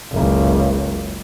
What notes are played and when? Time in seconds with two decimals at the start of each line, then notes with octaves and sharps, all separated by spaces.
0.13 F#1 C#2